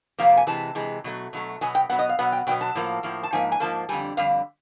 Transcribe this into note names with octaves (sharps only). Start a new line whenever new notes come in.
F2 C3 F3 A#3 F5
G#5
C3 E3 G#3 A5
C3 E3 G#3
B2 F#3 A3
B2 F#3 A3
B2 F#3 B3 G#5
G5
B2 F#3 B3 F#5
D#5
F5
B2 F#3 B3 F#5
G5
B2 F#3 B3 G5
A5
A2 F3 A#3
A2 F3 A#3
A5
G#2 F3 A#3 G#5
G#5
G#2 F3 A#3 A5
F2 D3 G3 G#5
F2 D3 G3 F5